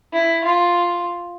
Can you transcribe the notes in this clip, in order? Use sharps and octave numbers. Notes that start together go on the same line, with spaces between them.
E4
F4